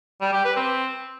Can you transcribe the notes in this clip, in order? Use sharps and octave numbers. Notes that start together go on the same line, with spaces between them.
G3
G4
B4
C4